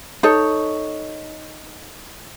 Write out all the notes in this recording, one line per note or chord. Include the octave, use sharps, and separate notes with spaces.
D#4 A4 C#5